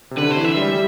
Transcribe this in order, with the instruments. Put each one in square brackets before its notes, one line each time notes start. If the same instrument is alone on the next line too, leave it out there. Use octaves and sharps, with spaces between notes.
[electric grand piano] C3
[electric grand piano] D3 [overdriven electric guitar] B4
[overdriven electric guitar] C5
[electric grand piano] E3
[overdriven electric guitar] E5
[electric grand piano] G3
G3